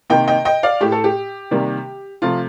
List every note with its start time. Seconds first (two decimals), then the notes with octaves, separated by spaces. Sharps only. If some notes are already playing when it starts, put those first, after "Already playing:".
0.10 C3 D#3 A#3 D#5 G5
0.28 D#5 G5
0.45 D#5 G5
0.63 D5 F5
0.81 A2 A3 G4
0.92 A4
1.04 G4
1.51 C3 D#3 G3 A#3
2.22 C3 F3 A3 F4